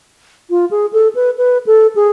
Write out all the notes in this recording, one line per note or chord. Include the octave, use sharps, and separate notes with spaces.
F4
G#4
A4
B4
B4
A4
G#4